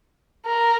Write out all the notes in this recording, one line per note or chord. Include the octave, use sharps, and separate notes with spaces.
A#4